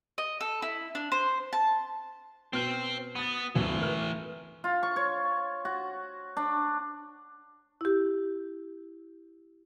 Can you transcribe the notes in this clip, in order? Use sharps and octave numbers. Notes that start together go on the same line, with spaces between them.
D#5
A4
E4
D4
C5
A5
B2 C5 G5 F6 D#7
B3 D#6 A6
G#1 D2 G2 E3 A3
A#4 B4 F6
F4
C#6
C#5
F#4
D4
E4 G4